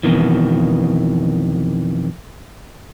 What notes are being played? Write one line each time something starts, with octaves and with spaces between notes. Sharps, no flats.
F2 B2 D#3 E3